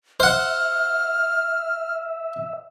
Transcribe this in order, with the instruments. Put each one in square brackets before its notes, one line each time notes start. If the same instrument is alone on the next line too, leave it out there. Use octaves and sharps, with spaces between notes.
[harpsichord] C5 F#5 [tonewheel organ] E5 [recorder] F6